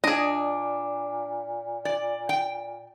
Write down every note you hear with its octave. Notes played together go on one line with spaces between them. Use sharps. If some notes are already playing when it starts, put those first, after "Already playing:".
A#2 D4 G#4 D#5
D5
G5